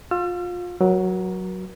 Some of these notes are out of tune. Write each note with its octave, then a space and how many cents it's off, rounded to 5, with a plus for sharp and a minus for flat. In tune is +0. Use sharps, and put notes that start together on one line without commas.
F4 +25 E6 +45
F#3 +0 A#4 +40